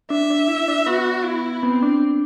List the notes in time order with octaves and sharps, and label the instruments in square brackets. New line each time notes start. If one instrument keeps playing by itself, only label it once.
[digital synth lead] D4 [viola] E5
[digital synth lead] D4
E4
D4
[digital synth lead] B3 [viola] F#4
[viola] E4
[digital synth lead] B3 [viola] C4
[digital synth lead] D4